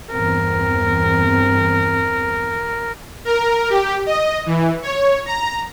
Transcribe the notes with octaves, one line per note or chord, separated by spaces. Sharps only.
E2 G2 C4 A#4
A#4
G4
D#5
E3
C#5
A#5